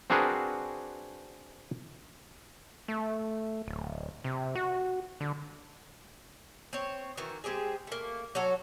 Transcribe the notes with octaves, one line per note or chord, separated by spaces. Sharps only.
C4 D4 F#4 G#4 A#4 B4
A3
D1
C3
F#4
D3
C4 C#5
D#3 E3 F#4
G#3 C4 G4 G#4
A3 A#3
F#3 C#4 F#4 A4